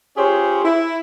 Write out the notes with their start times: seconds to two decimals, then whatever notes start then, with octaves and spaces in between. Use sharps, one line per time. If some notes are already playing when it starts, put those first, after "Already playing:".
0.17 C#4 F4 G4 G#4 C5 C#5
0.65 E4